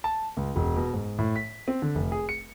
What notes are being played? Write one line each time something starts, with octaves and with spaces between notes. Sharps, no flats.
A5
C#2
E1
B2
G#2
A2
B6
C4
D3
F1
G#4
C#7